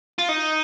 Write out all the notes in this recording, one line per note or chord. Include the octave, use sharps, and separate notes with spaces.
F4
D#4